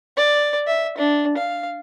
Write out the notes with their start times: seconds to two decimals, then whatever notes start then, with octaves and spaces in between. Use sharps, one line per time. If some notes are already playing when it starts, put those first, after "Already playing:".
0.17 D5
0.67 E5
0.98 D4
1.37 F5